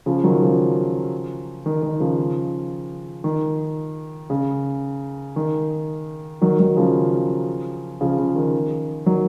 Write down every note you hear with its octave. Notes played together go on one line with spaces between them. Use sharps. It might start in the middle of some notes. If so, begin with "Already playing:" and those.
C#3 F3
D#3 F#3
C#3 F3
D#3
D#3
C#3 F3
D#3
C#3
D#3
D#3 F#3
D#3 F#3
C#3 F3
C#3 F3
C#3
D#3
D#3 F#3